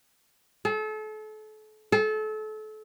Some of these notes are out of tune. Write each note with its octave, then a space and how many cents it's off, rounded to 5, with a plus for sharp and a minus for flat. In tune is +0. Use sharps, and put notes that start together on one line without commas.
A4 -35
A4 -30